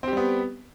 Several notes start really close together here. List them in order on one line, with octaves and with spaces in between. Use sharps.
C4 G4 G3 B3